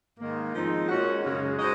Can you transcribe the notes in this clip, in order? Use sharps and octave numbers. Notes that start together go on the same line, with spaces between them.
G#2 D#3 A#3
F3 G#3 C4 D#4
A#2 G#3 C#4 F#4
F#2 C#3 G#3 C#4
G#3 D#4 F#4 C5 D#5